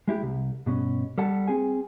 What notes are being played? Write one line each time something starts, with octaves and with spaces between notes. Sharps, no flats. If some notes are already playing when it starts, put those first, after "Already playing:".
G#3 E4 G4
C2
G2 B2 C#4
G3 A4 F#5 A5
C4 G#4 G#5